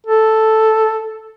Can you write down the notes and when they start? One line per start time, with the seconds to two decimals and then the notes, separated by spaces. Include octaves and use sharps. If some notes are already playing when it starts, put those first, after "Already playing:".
0.06 A4